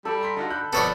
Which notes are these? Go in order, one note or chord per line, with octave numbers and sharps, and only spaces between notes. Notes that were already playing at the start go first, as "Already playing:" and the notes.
G3 A4 B5
A#5 C6 B6
D3 D#4 F4 F#4
B5 F#6 G6
B2 F3 B3 A4 C#5 D5